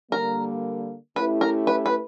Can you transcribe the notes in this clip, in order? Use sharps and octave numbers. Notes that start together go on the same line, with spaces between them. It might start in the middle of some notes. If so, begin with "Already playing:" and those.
D3 G3 A#3 A#4
A3 C#4 E4 G4 B4
A#4
B4
B4